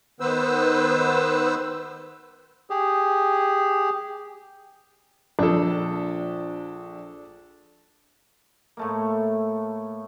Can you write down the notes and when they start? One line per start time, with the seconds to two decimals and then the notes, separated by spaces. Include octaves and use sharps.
0.20 D#3 B3 B4 C5 E6
2.70 G4 G#4
5.39 A#1 D4 A4
8.77 A2 A3 A#3